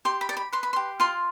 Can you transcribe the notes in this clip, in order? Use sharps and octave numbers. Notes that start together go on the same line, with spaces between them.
G4 C6
B5
D5
B5
B4 C6
B5
G4 C6
F4 C6